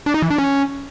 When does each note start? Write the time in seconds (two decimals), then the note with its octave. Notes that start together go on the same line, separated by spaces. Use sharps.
0.06 D4
0.14 D#4
0.22 E3
0.30 D4
0.38 C#4